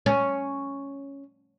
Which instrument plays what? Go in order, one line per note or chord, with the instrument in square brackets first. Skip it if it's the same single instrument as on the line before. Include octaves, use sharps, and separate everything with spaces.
[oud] C#4